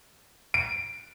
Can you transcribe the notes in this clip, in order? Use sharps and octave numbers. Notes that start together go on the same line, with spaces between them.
D7